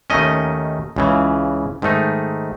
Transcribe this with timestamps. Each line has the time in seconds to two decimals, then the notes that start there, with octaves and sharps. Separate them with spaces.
0.10 D#2 D#3 A3 C#4 D#5
0.96 C#2 C#3 E3
1.82 G#2 D#3 A3 D#4